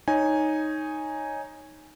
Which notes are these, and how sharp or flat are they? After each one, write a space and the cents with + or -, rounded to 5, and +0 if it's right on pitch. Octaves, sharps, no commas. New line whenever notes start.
D#4 +0 C#5 +0 G#5 -5